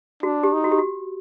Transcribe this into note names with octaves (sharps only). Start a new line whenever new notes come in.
D4 F#4
G4
D#4
F#4
G4
F#4